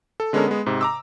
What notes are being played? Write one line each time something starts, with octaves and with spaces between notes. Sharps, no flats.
A4
D3 G#3 B3 C#4 A4 A#4
G#3 B3
G#2 C3
A#5 D6 E6